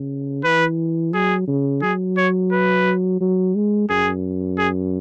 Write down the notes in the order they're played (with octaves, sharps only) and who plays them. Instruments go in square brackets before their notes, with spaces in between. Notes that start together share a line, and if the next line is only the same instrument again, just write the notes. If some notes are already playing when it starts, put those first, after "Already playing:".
Already playing: [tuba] C#3
[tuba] E3 [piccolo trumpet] B4
[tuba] F#3 [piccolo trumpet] G#4
[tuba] C#3
[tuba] F#3 [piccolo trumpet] G#4
[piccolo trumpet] C#5
B4
[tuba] F#3
G#3
[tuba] F#2 [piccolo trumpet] G#4
[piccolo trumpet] G#4